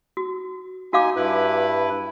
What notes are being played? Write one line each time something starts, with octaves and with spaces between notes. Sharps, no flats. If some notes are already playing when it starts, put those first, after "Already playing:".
F#4
D#4 F#4 F5 G#5 D6
G2 E4 B4